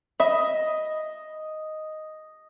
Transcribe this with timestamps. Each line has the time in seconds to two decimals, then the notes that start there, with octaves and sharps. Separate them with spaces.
0.20 D#5 E5 B5